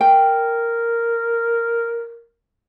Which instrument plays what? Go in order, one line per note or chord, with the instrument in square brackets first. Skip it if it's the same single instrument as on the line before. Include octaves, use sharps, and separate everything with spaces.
[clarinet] A#4 [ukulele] G5